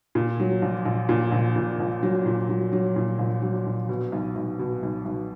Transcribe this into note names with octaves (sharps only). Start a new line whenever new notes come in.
A#2
F#3
A#1
A#1
A#2
A#1
A#2
A#1
F#3
A#2
F#3
F#3
A#2
A#1
F#3
A#1
B2
B1
B1
B2
B1
B1